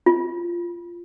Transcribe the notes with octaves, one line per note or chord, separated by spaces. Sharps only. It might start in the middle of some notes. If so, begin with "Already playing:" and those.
F4